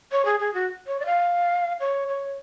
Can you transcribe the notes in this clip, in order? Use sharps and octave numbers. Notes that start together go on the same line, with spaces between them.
C#5
G#4
G#4
F#4
C#5
D5
F5
C#5
C#5